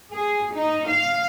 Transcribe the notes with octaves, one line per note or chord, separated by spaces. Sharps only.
G#4
D#4
F5